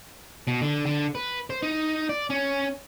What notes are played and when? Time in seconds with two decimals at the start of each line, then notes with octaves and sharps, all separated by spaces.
0.47 B2
0.61 D3
0.86 D3
1.15 B4
1.50 C5
1.63 D#4
2.09 D5
2.30 C#4